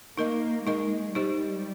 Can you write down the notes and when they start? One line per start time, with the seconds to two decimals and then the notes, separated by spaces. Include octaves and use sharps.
0.17 A#3 D#4 A#4 D#5
0.67 G#3 D#4 A#4 D#5
1.15 G3 D#4 G4 C5 D#5